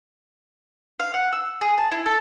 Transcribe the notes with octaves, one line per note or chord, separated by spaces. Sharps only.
F5
F#5
E6
G#4
A5
E4
A4